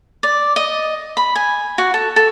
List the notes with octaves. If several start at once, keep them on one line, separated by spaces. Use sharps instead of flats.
D5
D#5
B5
G#5
F#4
A4
A4